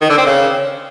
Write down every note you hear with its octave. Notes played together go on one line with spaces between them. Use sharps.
D#3
D3
C4
C#3